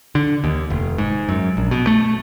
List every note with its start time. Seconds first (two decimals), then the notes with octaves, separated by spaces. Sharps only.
0.15 D3
0.44 D#2
0.70 F1
0.98 G#2
1.29 F#2
1.57 A#1
1.71 B2
1.87 A3